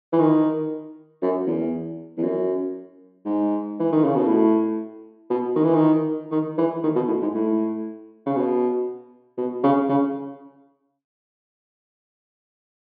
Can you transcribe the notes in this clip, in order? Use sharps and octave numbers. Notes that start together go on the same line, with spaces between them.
E3
D#3
F#2
E2
E2
F#2
G#2
E3
D#3
C#3
B2
A2
B2
D#3
E3
D#3
D#3
E3
D#3
B2
A2
G#2
A2
C#3
B2
B2
C#3
C#3